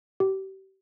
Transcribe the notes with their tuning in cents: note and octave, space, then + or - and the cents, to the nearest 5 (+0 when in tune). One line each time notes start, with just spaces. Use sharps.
G4 -35